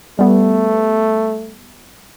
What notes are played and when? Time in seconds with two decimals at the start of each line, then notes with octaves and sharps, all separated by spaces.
0.19 G3 A3 B3